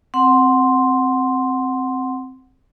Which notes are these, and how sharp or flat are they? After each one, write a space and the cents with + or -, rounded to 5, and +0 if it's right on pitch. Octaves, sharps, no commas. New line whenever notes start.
C4 +0 F#5 +0 C6 +0